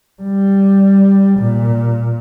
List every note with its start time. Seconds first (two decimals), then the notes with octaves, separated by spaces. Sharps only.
0.22 G3
1.39 A#2